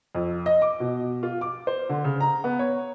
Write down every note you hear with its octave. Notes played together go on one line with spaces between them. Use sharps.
F2
D#5
D6
B2
F4
D6
C5
D3
C#3
A#5
B3
C#5